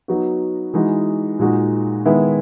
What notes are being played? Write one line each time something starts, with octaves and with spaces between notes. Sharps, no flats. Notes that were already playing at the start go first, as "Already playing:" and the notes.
F#3 B3 D#4 F#4
E3 G#3 D#4 F#4
A#2 G#3 D#4 F#4
D#3 G#3 B3 E4